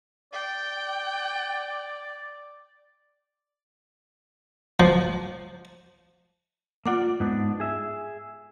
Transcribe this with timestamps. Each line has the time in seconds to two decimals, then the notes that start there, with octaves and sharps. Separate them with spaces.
0.33 D5 G5
4.80 F3
6.86 A#3 F4 D5 F#5 D6
7.20 G#2 B3 D4
7.60 G#4 E5